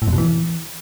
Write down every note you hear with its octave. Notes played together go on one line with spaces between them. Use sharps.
A2
F2
B2
E3